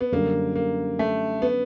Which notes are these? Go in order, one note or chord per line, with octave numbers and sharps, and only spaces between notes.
B3
F#2 D3 G3 A#3
A#3
A3
B3